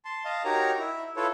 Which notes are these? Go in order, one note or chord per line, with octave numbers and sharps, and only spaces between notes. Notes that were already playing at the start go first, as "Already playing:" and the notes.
A5 C6
D#5 F5 A5
D#4 F#4 G4 A#4 C#5 A#5
E4
E4 F4 A4 B4 C#5